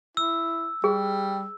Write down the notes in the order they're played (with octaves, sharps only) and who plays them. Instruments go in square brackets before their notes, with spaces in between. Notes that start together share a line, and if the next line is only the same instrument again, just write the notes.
[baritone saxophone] E4 [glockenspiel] E6
[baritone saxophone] G3 [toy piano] G#4